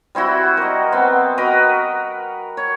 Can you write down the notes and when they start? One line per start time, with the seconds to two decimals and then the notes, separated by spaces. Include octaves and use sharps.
0.15 G3 C4 E4 F#4
0.57 A#4 D#5
0.92 B3 C4
1.38 F#4 A#4 B4 D#5
2.57 C#5